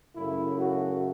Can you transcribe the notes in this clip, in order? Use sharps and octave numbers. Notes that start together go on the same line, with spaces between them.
F#2 C#3 A3 E4
F#4